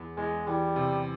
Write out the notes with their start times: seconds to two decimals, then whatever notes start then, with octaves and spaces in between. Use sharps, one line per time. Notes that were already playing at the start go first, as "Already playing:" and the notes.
Already playing: E2
0.17 E2 G#3
0.47 E3 G3
0.76 C3